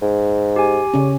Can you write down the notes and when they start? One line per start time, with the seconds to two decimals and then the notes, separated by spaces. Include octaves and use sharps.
0.02 G#2
0.56 G4 G#5
0.94 C#3 C#4